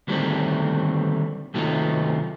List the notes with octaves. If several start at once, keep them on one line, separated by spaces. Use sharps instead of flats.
D3 D#3 F#3 G3 A3 C4
C3 D#3 F#3 A3 D#4 F4